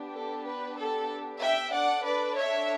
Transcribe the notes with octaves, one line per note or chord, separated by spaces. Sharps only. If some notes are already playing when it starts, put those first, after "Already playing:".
Already playing: B3 D4 G4
A4
B4
A4
E5 G5
D4 A4 D5 F#5
B4 D5
C#5 E5